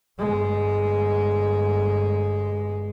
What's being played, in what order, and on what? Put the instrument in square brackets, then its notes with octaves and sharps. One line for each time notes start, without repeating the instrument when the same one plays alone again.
[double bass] G1 G#3